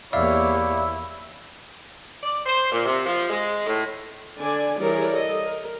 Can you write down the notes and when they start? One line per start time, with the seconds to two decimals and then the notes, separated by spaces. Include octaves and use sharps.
0.13 E2 A#3 E4 G4 C#5 D5 E5 F5
2.24 D5
2.46 C5
2.72 A#2
2.86 C3
3.06 F3
3.30 G#3
3.67 A2
4.37 D3 D4 D5 G#5
4.80 E3 G3 G#4 A#4 C#5 D5
5.11 A4 D#5
5.46 A#4